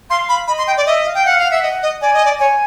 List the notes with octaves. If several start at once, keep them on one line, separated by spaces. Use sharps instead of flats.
F5 C6
B5
D#5 B5
C6
G5
D5
D#5 E5
F5
G5
F5 F#5
F5
F#5
E5
D#5
D#5
D5 G#5
D#5
D5
C#5 G#5